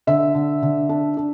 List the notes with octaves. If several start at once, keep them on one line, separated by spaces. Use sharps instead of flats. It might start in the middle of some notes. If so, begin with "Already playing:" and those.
D3 E5
D3
D3
D4
D4